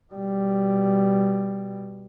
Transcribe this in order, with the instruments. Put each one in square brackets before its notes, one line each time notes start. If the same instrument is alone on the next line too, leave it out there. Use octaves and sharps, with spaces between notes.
[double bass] B2 G3